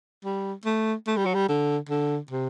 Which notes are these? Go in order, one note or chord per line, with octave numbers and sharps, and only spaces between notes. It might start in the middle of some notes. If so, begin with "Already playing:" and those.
G3
A3
A3
G3
F#3
G3
D3
D3
C3